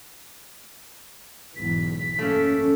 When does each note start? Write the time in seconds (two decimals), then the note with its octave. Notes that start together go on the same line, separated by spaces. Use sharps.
1.56 B1 E2 G#2 B6
2.19 F#2 A3 A#3 C#4